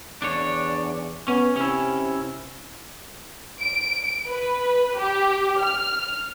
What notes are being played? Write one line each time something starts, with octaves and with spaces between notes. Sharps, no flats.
E2 D4 C#5
B3 C#4
C3 C#4 E4
D7
B4
G4
F6